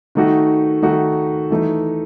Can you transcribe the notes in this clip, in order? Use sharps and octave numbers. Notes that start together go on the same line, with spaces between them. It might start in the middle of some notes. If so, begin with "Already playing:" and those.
D#3 A3 D#4 F#4
D#3 A3 D#4 F#4
E3 A3 D#4